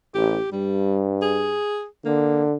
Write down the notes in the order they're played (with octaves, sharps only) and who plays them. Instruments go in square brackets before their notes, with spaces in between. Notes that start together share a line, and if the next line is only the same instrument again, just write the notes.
[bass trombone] A1 [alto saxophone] G4
[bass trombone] G2 [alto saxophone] G3
[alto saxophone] G#4
[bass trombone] D3 [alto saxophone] A#3